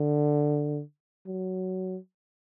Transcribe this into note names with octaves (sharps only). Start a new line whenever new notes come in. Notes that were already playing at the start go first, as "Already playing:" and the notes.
Already playing: D3
F#3